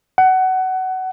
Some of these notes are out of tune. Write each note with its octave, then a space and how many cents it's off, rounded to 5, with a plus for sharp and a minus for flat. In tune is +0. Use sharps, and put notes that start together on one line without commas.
F#5 +20